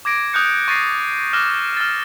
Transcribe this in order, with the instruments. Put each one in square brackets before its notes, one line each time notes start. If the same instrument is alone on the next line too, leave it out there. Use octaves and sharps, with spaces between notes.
[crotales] D6 G#6 A#6 D7
D#6 F#6 G6 C#7
C#6 A6 A#6 C7
D6 F6 F#6 A#6 E7
F6 A6